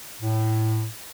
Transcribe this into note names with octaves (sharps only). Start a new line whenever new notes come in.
A2